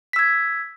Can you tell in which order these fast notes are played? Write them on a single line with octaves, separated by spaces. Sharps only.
B6 E6 G#6